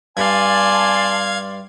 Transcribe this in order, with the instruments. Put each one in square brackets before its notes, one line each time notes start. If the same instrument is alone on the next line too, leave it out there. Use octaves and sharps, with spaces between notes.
[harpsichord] G2 [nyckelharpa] D5 C6 [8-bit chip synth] F5 G#6 [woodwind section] G#5 A5